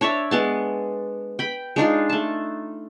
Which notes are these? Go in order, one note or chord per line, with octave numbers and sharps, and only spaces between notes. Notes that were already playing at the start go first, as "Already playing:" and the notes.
D4 C#5 D5 E5
G#3 B3 A5
G5 B5
G#3 D4 D#4 F4
A3 A5